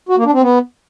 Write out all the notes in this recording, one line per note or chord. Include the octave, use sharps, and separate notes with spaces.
F#4
A#3
D4
C4
B3